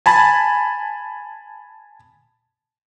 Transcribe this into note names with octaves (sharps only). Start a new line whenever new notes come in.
G#5 A5 B5